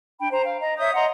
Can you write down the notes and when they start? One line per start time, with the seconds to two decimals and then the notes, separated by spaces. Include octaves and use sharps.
0.20 D4 G5 B5
0.32 C5 A#5
0.45 F5
0.62 D#5 A#5
0.78 C#5 E5 D#6 G6
0.94 D#5 F#5 A#5 C6